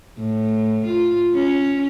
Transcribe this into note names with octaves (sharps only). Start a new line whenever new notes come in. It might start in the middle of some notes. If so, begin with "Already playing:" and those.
A2
F4
C#4